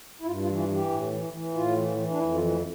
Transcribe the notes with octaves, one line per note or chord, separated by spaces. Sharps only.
E4
G2 F4
F4
E3
F4
E3 G4
A2
E3
E3
A2 F4
E3
E3
D4
F2 E4
F4
E3
A3